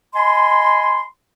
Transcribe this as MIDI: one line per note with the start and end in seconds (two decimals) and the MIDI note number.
0.15 1.03 75
0.15 1.03 80
0.15 1.03 83
0.15 1.03 84